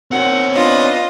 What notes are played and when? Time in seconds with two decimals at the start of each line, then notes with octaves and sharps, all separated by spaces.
0.11 D#3 C4 C#4 F#5
0.55 B3 D4 F4 D#5